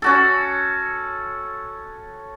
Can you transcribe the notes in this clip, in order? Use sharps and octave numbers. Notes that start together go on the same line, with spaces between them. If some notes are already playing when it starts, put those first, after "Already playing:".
C#4 F#4 A4